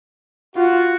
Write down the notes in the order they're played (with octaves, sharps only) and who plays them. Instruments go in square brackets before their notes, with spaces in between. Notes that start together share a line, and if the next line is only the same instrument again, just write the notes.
[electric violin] F4 [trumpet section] F#4